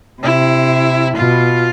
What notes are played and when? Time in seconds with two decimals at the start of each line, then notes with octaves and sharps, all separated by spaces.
0.23 C3 E4
1.17 B2 F4